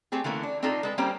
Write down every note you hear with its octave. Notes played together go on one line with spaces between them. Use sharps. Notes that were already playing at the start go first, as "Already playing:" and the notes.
A3 C4 G4 G#4
D3 E3 A3 A#3 C#4
D4
C4 D4 D#4 F4 A4
G#3 A4 B4
G3 A#3 C4 C#4 G4 C5